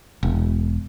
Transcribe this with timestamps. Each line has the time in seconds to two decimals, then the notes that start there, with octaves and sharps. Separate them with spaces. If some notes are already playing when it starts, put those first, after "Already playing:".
0.23 E1